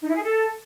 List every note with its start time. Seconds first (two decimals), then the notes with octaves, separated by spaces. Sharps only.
0.01 D#4
0.08 E4
0.15 G#4
0.22 A4